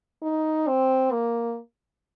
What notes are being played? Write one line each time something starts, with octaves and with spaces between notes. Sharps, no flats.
D#4
C4
A#3